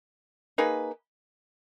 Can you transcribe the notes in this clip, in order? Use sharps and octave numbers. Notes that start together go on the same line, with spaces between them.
A#3 D#4 G#4 B4